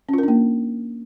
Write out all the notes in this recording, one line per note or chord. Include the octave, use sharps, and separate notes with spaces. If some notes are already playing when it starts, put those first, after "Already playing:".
A#3 C#4 D4 F4 A#4